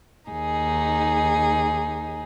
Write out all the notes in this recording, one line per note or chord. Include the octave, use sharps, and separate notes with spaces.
D#2 D#4 G#4